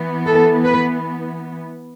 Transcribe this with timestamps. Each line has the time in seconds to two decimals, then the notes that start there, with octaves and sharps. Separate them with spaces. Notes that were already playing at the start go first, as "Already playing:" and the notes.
Already playing: E3 B3
0.26 A4
0.64 B4